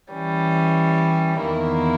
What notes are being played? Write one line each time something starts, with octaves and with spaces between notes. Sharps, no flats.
E3 G3 C#4
E2 D#3 A#3 E4